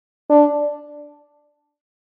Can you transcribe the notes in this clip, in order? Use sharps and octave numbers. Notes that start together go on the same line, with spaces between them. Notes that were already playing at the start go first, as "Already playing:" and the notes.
D4